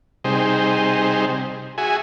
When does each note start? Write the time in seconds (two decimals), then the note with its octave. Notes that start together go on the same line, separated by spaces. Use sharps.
0.24 C3 G3 D#4 G#4 C5
1.78 F#4 G#4 E5 G#5